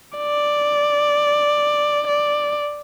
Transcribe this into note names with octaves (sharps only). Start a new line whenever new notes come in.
D5
D5